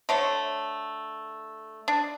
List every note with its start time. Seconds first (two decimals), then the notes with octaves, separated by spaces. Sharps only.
0.09 D3 A3 C#5
1.88 D4